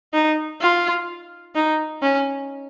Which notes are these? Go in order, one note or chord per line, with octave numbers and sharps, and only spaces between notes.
D#4
F4
D#4
C#4